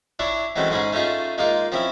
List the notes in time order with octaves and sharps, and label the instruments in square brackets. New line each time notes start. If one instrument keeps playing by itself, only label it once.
[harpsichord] D4 E4 C#5
E3 F#3 G#3 A3 C4 C#4
G#2 G#3 C#4 G#4 B5
A3 C#4 D#4 F4 G#4
G#3 A#3 D#4 F4
F3 C4 C#4 E4